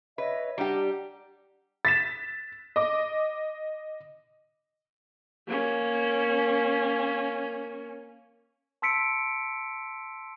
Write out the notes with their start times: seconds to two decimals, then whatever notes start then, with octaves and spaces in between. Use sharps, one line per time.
0.18 B4 C#5 D#5 E5
0.58 G3 D4 G4 F#5 A#5
1.85 A6 B6 E7
2.76 D#5 D6
5.47 A#3 C#4
8.82 A5 C6 E6 B6 C#7 D7